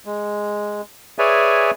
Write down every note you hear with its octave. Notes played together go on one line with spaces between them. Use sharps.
G#3
G#4 B4 C#5 D5 E5 G#5